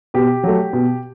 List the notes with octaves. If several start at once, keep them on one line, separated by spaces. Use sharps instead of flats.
B2 G4
F#3 A3
B2